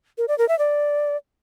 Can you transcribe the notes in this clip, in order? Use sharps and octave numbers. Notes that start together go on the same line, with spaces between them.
A#4
D5
A#4
E5
D5